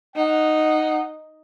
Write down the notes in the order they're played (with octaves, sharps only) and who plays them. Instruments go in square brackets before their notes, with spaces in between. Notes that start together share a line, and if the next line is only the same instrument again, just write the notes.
[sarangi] D#4 [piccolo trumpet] F#5